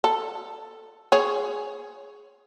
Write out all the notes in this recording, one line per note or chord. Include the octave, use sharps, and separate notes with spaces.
A4
G#4 C#5